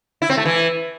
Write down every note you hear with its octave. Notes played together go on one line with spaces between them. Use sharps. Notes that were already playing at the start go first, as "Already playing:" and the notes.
E4
C4
A3
E3